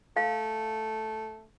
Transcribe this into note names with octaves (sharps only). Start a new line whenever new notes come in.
A3 F5